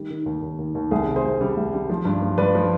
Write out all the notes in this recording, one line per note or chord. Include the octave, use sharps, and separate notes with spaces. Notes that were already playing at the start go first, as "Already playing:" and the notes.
Already playing: D#3 G3
D#3
D#2
D#2
D#2
D#2
C2 G#4
C3
G#4 C5
C2
G3
C2
G3
F3
G2
F3
G2 B4 D5
F3